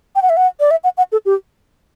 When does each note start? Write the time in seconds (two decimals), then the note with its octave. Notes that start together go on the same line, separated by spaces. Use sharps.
0.16 G5
0.22 F#5
0.30 E5
0.37 F#5
0.60 D5
0.71 E5
0.84 F#5
0.97 F#5
1.12 A4
1.26 G4